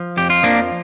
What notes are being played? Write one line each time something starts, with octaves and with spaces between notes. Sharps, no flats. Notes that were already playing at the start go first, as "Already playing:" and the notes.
Already playing: F3
F2 G4
F4
F3 A#3 D4